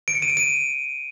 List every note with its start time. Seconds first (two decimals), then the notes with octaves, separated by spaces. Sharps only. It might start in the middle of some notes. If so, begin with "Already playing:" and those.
0.08 D7
0.15 C#7
0.22 D#7
0.30 D7
0.37 D#7